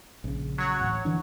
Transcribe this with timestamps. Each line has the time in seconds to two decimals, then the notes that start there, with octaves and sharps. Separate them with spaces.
0.24 A#1 C#3
0.58 F#3 C#5 F#5
0.79 D1 A1
1.05 D3 E3 D4